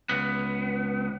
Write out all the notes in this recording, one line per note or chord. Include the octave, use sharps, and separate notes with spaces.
C#2 B3